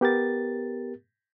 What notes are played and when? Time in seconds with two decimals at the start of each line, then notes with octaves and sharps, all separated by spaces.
0.01 B3 G4 A#4 A6